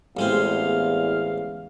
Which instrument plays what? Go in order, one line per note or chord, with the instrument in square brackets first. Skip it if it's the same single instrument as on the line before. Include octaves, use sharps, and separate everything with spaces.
[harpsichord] A1 G#3 C4 [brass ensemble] E2 F5